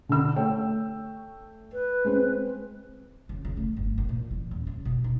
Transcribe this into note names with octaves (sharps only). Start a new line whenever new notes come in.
D3 E6
A3 C#5 G5
B4
G#3 C4
C#3
C#3
A3
G1
A#1
A#2
E3
D#1
C#3
B2
D#4